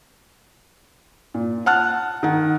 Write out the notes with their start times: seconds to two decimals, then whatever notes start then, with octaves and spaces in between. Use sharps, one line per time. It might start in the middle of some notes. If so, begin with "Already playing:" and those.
1.34 A#2
1.66 F#5 A5 F6 F#6
2.23 D#3 F#5